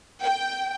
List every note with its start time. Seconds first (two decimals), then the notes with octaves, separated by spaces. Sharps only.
0.21 G5